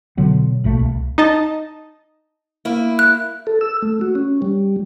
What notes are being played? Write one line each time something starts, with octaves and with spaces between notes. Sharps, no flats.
B2 D3 F#3 B3
A#1 B2 A3 A#3
C2
D#4 D#5 A5
A#3 E4
F#6
A4
E6
A3
F#4
C#4
G3